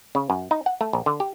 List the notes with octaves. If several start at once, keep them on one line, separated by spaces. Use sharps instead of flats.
C#3
F#2
D#4
F#5
A3
A#1
D3
G4